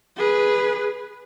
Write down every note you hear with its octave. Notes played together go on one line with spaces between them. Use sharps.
G#4 B4